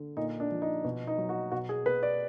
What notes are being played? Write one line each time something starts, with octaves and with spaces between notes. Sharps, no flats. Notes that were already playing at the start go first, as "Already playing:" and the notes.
Already playing: D3
A#2 D#4
D4
F3
D#4
B2
D#4
F#3
F#4
B2 F#4
G#4
B2 B4
D5